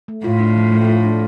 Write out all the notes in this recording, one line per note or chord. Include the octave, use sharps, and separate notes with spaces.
A3
A2 F4
D4
F3
A3
F4
D4